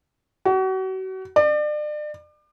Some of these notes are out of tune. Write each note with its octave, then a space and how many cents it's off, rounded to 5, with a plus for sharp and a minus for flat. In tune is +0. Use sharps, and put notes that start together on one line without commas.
F#4 +35
D5 +35